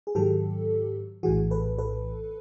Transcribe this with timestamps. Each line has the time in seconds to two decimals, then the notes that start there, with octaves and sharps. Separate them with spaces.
0.07 G#4
0.15 G#2 D#3 F#3 G4 A4
1.23 A#1 A2 E3 F#4 G#4
1.51 A4 B4
1.78 A4 B4